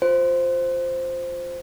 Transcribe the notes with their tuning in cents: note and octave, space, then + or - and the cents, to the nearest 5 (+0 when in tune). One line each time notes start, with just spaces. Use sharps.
F4 +20 C5 +0